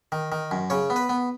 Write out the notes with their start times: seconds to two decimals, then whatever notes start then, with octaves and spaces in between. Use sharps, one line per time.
0.12 D#3
0.32 D#3
0.51 F#2
0.70 C#3 C#5
0.90 B3
0.96 B4
1.09 B3